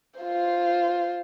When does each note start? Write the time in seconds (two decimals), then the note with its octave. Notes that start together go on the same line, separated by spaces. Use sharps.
0.20 F4 C5